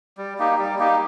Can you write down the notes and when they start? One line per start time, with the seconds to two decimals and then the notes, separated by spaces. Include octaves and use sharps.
0.17 G3
0.39 A#3 D#4 G4
0.59 G3
0.79 A#3 D#4 G4